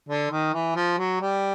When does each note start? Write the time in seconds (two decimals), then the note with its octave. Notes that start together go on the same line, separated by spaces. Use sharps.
0.09 D3
0.31 D#3
0.54 E3
0.76 F3
0.98 F#3
1.21 G3